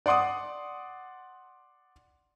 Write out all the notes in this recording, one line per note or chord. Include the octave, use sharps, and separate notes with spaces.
D5 F#5 C6 D6 D#6